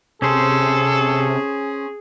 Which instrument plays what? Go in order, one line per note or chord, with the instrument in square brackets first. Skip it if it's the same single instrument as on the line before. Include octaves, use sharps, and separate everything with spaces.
[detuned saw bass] C3 [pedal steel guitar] C#4 C5 [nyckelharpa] G#4 [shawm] A4